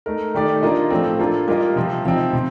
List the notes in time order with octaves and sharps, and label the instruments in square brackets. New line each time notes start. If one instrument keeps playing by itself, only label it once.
[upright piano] A3 D#4 A#4
D#3 A3 D#4 G4 D5
A#3 D4 F4 A#4 D#5
A2 F3 A3 C4
A#3 D4 F4 A4
G3 A#3 F4 A#4 D#5
C3 F3 C4
C3 F3 C4 D#4
C3